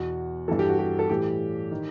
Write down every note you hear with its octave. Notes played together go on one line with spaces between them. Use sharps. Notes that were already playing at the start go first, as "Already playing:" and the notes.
Already playing: E2 B2 F#4
G2 E3 A4
G4
F#4
G4
A4
A2 E3 G4
D#3